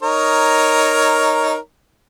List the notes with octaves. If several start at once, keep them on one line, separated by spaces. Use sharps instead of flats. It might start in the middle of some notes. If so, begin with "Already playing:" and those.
D#4 A#4 C#5